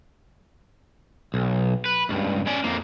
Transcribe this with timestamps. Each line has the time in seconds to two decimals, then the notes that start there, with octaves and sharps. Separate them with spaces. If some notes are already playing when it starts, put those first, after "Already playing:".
1.34 B1
1.86 B4
2.09 C#2 G2
2.47 C#4 D5
2.64 F2 A#3